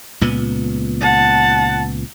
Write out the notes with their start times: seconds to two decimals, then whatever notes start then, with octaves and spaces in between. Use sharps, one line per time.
0.21 C#2 A#2 B3
1.01 F#5 A5